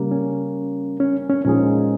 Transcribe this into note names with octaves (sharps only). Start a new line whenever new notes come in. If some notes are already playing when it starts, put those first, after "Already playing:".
Already playing: C#3 G3 A#3
C#4
C#4
C#4
A#2 F3 G#3 C#4 D#4 G#4